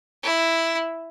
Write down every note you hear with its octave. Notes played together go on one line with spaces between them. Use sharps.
E4